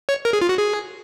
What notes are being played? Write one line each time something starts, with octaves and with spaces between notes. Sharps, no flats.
C#5
A#4
G#4
F4
F#4
G#4